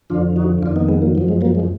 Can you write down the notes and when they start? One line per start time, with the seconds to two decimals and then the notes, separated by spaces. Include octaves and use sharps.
0.10 F2 D3 F3 D4 F4
0.36 D#4 F#4
0.62 F2 D4 F4
0.66 D#3
0.76 B3 D#4
0.88 G#3 B3
1.02 F#3 A#3
1.15 F#2 F3 F#3
1.28 G#3
1.41 F#3 A#3
1.55 G#3